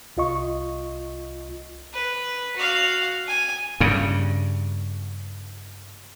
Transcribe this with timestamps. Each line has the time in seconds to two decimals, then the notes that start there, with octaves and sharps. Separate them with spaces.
0.17 C2 F4 D#5 C#6
1.93 B4
2.56 F#4 F5
3.27 G#5
3.80 G2 C#3